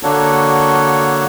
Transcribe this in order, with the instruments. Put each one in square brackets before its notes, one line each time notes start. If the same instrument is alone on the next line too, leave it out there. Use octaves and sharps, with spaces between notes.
[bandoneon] D3 A#3 D4 F#4 A4 C#5